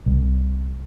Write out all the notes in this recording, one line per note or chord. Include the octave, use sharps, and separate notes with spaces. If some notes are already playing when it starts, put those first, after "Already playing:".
C2